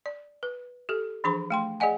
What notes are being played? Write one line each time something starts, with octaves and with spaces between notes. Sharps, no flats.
D5
B4
G4 A4
E3 F3 D4 G#4 B5 C#6
A3 G5 C6
G#4 D5 D#5 F#5 G#5